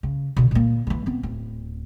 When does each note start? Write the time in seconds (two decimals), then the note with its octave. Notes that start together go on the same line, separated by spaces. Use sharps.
0.03 C#3
0.36 B2 D3
0.51 A#2 A#3
0.87 D#3 E3
1.06 B3 C4
1.23 D1